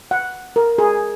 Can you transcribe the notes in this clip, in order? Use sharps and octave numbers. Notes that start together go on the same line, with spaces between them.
F#5
A#4
G#4